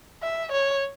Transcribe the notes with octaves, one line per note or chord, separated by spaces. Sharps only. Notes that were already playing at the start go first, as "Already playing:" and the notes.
E5
C#5